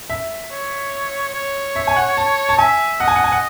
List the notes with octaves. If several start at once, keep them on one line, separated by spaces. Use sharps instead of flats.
E5
C#5
C#5
E5
G#5
F#5
A5
A5
E5 G#5
D#5 F#5
G#5
F#5
G#5
F#5